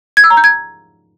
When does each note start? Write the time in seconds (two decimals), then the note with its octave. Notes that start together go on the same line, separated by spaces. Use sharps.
0.17 G#6
0.24 E6
0.30 A#5
0.37 G6
0.44 G#6